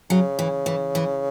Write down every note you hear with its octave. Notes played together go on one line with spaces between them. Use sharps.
C#3 F#3
E3
E3
E3